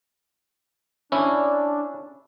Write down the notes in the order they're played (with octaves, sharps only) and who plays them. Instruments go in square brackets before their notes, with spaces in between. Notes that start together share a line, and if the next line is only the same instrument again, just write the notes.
[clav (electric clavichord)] C#4 E4 [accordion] D4